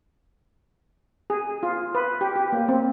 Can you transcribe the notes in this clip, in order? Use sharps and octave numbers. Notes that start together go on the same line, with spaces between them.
G#4
F4
B4
G4
G4
A#3
C4